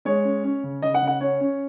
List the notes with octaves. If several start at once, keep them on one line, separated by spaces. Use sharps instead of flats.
G#3 C#5
C#4
C#4
C#3
C#3 D#5
F#5
C#3
F#5
C#4 C#5
C#4